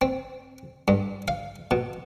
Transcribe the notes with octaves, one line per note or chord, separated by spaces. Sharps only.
C4
G2
F5
B2